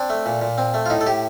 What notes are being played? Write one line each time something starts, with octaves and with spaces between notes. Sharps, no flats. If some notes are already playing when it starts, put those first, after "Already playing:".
Already playing: C4 D4
A3
A#2
A#2
C4
A3
F4
A2 D#4
A4
A2 G4